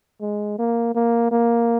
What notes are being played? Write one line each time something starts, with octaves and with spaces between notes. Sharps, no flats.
G#3
A#3
A#3
A#3